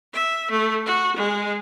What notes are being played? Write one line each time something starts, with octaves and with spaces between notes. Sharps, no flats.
E5
A3
F#4
G#3